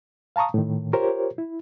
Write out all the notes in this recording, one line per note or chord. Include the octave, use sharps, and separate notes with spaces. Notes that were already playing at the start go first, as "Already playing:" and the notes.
F5 A5 A#5 C#6 D#6
A2 D#3
F4 G4 A#4 C5 C#5
E4